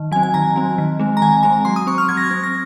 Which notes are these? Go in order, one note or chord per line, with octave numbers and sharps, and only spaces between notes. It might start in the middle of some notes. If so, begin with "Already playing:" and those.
Already playing: D#3
F#3 C4 G#5
G#5
D#3 A#5
F#3 C4
D#3
G#3 C4
A#5
D#3 G#5
G#3 C4 A#5
F#3 C6
D#6
C4 C#6
F6
F#3 G#6
A#6
G#6
C4
A#6